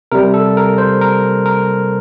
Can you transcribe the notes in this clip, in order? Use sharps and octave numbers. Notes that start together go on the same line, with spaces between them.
C3 G3 A#4
A4
A#4
C5
A#4
A#4